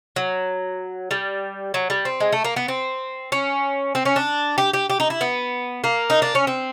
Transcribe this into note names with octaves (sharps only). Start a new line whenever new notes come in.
F#3
G3
F#3
G3
C4
G#3
A3
A#3
B3
C4
C#4
C4
C#4
D4
G4
G4
G4
D#4
E4
B3
A#3
D#4
D4
C#4
C4